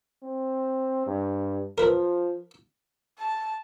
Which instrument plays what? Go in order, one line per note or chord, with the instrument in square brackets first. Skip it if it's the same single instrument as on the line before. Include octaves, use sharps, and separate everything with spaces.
[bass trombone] C4
G2
[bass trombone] F3 [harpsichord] A#4 B4
[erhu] A5